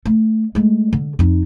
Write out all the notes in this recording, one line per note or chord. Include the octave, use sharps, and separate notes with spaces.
A3
G#3 A3
D3
F2 D#4